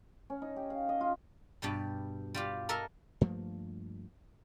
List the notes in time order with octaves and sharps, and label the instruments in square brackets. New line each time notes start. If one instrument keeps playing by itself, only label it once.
[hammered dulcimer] C#4
D#4
G4
F5
D#5
F4
[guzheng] G2 B2 G3
G3 F4 G4
A4 A#4 D#5 E5 A#5
[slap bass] G2 F3 A3 A#3